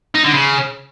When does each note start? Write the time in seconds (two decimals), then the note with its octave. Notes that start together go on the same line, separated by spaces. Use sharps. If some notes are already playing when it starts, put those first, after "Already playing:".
0.15 D#4
0.24 D3
0.34 C#3